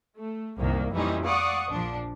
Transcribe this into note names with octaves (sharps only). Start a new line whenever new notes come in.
A3
C2 F#2 D#3 A#3
F2 A#2 E3 G3 C#4 D#4
D5 F5 F#5 C#6 D#6
A#1 F3 D4